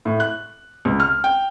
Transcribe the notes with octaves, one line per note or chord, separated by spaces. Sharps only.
A2
F#6
C#2
F6
G5